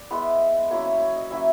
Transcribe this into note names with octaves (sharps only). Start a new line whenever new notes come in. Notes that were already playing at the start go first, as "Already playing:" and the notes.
Already playing: D5
G#3 B3 E4
F#3 A#3 C#4 E4 C#5
C#5
C#5
D#5
F#3 A#3 C#4 E4 E5